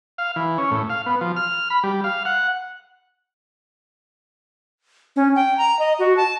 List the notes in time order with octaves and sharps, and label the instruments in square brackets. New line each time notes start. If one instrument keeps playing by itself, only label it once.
[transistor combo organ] F5
E3
C#4
A2
F5
B3
F3
F6
B5
G3
F5
F#5
[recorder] C#4
G5
A#5
D#5
F#4
A5